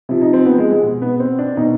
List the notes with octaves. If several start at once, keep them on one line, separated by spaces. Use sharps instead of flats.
C3 F3
D#4
C4
B3
G#3
G#3
B2
B3
C4
D4
B2 D#4